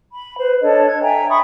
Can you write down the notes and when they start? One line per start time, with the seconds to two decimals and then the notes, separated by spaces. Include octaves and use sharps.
0.12 B5
0.37 B4 C5
0.61 D4 A4 C#5 D#5
0.85 G#6
1.02 E5 G5 G#5 A#5
1.30 E5 B5 C#6 D#6